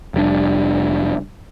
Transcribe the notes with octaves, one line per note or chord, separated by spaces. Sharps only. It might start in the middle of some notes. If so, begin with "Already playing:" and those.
F1 G3 D4